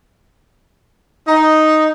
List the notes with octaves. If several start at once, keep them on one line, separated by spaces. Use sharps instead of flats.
D#4